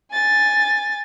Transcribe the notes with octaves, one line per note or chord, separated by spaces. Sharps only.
G#5 A6